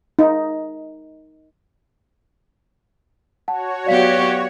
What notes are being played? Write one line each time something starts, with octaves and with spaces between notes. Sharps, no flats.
D#4
F#4 C#5 F#5 A5
F#3 B3 G4 D5 F5 B6